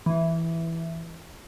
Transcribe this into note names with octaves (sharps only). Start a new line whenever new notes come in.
E3